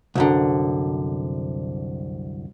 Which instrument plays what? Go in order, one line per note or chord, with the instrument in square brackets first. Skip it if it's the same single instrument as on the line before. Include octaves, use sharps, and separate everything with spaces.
[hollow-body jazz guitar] C2 F#2 D3